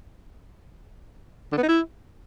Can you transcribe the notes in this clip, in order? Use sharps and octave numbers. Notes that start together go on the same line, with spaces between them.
D3
B3
D#4
E4